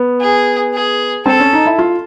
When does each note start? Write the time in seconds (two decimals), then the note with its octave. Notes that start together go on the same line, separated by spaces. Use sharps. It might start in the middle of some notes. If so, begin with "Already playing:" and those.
Already playing: B3
0.21 G#4
0.74 G#4
1.26 C4 A4
1.40 C#4
1.53 D#4
1.66 E4
1.79 F4